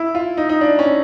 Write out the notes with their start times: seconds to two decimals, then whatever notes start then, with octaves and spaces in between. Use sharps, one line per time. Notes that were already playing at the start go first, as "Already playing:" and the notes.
Already playing: E4
0.15 F4
0.37 D#4
0.49 D#4
0.61 D4
0.79 C#4